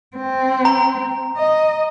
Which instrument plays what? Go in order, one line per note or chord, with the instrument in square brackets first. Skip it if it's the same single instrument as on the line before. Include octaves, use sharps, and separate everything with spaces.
[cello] C4
[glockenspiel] A#5
[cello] D#5